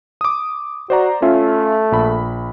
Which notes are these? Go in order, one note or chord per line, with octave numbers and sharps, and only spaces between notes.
D6 D#6
F#4 C5 D5 A#5
A3 C#4 F4 E5
A#1 B5